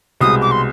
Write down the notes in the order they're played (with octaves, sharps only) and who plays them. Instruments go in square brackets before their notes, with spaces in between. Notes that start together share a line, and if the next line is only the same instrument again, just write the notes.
[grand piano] C2 B2 G#3 [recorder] D#6
[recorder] D6
C6